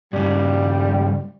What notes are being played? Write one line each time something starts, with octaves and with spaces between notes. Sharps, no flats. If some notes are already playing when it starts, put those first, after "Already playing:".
G2 C#3 G3